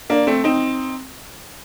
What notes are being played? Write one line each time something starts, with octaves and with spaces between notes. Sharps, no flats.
A#3 D4
A3 C4
C4 D#4